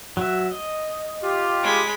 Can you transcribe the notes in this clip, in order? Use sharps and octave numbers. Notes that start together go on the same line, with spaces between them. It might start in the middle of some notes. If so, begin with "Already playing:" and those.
F#3 F#4 E5
D#5
F4 G4
G#3 B5